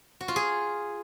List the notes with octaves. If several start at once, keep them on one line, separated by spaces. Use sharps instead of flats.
F#4
F4
G#4